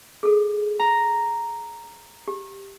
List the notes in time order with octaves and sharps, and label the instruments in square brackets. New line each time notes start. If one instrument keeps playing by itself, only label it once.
[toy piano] G#4 A4
[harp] A#5
[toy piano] G4